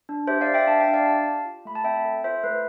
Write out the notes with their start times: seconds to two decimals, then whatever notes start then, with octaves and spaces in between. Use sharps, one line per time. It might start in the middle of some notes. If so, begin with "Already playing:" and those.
0.09 D4
0.27 G4 C5 E5
0.41 D5 F5
0.47 G4
0.54 E5 G5
0.67 D4 F5 A5
0.80 E5 G5
0.87 D4
0.93 D5 F5
1.06 G4 F5 A5
1.26 G4
1.45 F4
1.65 A3 B5
1.75 A5
1.84 C4 E5 G5
2.05 A4
2.24 F4 C5 E5
2.43 A3 B4